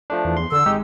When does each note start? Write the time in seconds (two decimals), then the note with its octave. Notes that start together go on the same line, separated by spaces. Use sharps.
0.10 F3 A3 D4
0.25 E2
0.37 C6
0.52 D3 E6
0.66 G#1 G#3 D#4 G4